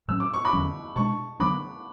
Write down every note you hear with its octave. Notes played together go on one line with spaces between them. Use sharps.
A2 F#3 C#4 E6
D6
C#6
B5 D6
E2 D3 F#3 C#4
B2 G#3 D4 A5 C#6
D3 F#3 B3 D4 B5 D6